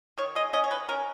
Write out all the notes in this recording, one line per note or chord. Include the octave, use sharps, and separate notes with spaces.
D#3 C#5
G#3 D#5
C#4 D#5
C#5
D#3 B4
C#4 A#4